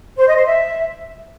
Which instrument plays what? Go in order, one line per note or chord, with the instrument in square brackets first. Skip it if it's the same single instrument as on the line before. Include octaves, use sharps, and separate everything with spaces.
[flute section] C5
D#5
C5
E5